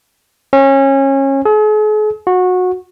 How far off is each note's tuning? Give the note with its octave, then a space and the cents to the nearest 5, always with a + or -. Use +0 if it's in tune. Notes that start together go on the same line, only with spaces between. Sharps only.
C#4 -25
G#4 +45
F#4 -20